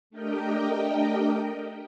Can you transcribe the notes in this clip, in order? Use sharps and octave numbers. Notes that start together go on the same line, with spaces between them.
A3 D4 G4 A#4 D#5 G5